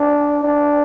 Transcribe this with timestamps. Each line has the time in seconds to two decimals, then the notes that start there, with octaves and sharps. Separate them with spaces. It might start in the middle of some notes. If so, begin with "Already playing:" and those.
Already playing: D4
0.44 D4